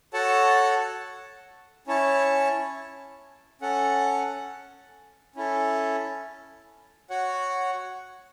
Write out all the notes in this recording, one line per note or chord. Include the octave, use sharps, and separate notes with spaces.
F#4 A4 C#5 F#5 A5
C#4 E4 C#5 A5
C#4 A4 F#5
C#4 E4 A4
F#4 C#5 F#5